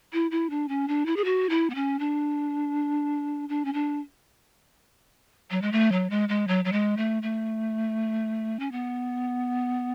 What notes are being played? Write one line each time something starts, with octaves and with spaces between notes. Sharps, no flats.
E4
E4
D4
C#4
D4
E4
G#4
F#4
E4
B3
C#4
D4
D4
C#4
D4
F#3
G#3
A3
F#3
G#3
G#3
F#3
F#3
G#3
A3
A3
C#4
B3